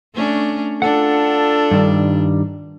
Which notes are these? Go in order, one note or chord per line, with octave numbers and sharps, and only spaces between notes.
A3 C#4 D4
D4 F4 A4 F#5
G2 D#3 G3